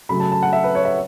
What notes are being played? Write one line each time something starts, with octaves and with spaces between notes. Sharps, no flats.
C#3 F#3 A3 B5
A5
A5
F#5
E5
B4
C#5
E5